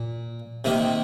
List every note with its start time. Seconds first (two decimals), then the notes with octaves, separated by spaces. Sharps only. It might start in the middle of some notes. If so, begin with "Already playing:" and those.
Already playing: A#2
0.64 C3 D#3 A#3